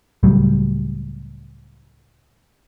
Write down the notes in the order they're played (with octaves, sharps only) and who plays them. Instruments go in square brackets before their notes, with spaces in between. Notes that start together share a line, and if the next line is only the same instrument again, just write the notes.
[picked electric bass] C#2 A2 F#3 G3